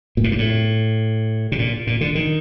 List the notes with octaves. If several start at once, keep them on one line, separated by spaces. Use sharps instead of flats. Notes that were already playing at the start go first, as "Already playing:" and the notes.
A#2
A2
G2
A2
C3
A#2
A#2
D3
D#3